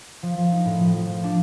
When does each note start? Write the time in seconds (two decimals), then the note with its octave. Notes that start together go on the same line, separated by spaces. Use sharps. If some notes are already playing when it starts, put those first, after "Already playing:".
0.23 F3
0.38 F3
0.52 D#4
0.65 A2
0.80 F3
0.94 F3
1.09 F3
1.24 D4